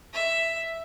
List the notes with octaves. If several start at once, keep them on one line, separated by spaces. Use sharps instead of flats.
E5